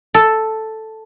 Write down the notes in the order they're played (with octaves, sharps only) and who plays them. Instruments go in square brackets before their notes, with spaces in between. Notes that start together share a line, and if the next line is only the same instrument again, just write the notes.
[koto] A4